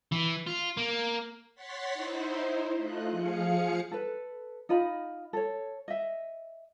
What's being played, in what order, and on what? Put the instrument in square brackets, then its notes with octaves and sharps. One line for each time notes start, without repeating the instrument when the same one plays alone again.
[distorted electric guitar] E3
F4
A#3
[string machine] C#5 F#5 C6 A6 B6
D#4 E4 C5
A3 F4 D#5 F#6
F3 G#4 F5 C#7
[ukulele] A4 B4
D#4 F4 D#5 B5
A4 C#5
D#5 E5